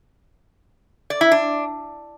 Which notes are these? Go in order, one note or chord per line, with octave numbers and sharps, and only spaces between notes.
D5
E4
D4